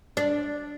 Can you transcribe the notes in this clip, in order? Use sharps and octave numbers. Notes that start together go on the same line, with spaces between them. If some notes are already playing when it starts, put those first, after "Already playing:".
D4